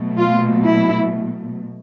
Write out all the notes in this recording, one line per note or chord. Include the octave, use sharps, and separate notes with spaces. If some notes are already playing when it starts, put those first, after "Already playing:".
Already playing: B2 F#3 A3
F4
E4